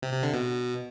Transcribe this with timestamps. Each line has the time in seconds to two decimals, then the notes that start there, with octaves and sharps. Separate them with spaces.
0.02 C3
0.13 C3
0.23 D3
0.34 B2